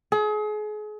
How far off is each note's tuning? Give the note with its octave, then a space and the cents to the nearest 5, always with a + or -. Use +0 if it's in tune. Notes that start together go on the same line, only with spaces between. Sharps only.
G#4 +35